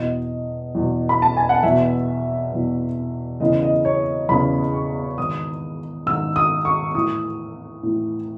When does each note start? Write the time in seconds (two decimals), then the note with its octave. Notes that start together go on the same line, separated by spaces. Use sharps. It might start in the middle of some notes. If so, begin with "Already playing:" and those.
Already playing: E2 B2 D#5
0.75 E2 B2
1.09 B5
1.22 A5
1.37 G#5
1.49 F#5
1.63 E2 B2 E5
2.52 E2 B2
3.40 E2 C#3 E3 D#5
3.62 D#5
3.85 C#5
4.29 E2 C#3 E3 B5
4.74 C#6
5.18 G#2 D#3 D#6
6.06 G#2 D#3 E6
6.36 D#6
6.65 C#6
6.94 A2 E3 D#6
7.83 A2 E3